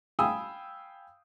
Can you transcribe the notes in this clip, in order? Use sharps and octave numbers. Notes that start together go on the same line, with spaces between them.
F5 G5 G#5 B5 D#6 E6